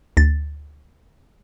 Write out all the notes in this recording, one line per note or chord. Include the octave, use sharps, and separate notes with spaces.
D2 A6